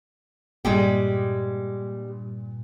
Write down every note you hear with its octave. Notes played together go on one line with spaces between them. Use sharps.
G2 A#2 G3 G#3 G4